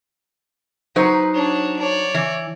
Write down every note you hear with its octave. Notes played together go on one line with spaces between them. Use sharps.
F#3 D#4 B4 C5
D4 C#5
C#5 D5
E3